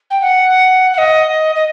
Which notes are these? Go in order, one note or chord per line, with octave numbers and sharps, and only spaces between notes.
G5
F#5
F#5
D#5
D#5